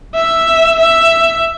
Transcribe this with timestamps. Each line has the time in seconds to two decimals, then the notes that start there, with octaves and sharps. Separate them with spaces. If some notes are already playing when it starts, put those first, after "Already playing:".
0.15 E5
0.80 E5